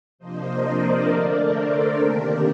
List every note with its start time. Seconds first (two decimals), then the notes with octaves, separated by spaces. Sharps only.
0.18 C3 F3 A#3 D4 C5 D#5
0.63 A#4 D5
1.07 D3 A3 D4 A#4 D5
1.51 A4 C5
1.95 C3 D#3 A#3 D4 G4 A#4